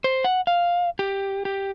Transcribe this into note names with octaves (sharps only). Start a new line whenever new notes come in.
C5
F#5
F5
G4
G4